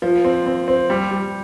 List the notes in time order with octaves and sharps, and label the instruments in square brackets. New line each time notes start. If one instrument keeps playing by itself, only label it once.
[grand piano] F3
C4
C4
C4
G3
G3